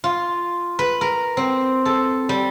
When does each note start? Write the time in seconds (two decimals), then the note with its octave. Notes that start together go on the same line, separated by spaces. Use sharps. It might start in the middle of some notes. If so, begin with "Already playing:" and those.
0.04 F4
0.79 B4
1.01 A#4
1.37 C4
1.85 A4
2.29 G3